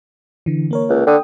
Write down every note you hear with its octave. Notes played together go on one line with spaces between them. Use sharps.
D3 E3
A#3 A#4 C#5
C#2
D3 G5 D#6